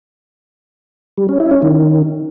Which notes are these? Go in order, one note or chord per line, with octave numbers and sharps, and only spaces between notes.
G3
C#4
E4
C#4
D#3